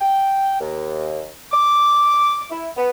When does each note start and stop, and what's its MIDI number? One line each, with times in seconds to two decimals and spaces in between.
0.01 0.56 79
0.61 1.27 39
1.52 2.46 86
2.51 2.69 64
2.77 2.90 59